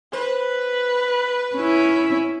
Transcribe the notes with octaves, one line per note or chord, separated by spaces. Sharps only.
B4 C5
C#4 E4